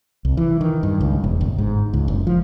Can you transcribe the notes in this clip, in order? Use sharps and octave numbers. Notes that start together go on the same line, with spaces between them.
C2
E3
D#3
G2
C#2
E1
G1
G#2
C#2
F#1
F3